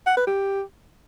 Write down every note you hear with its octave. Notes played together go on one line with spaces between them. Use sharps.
F#5
B4
G4